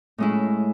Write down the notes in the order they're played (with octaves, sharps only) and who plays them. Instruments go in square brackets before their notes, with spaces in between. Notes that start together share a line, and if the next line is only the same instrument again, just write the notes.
[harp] A2 G#3 C#4 E4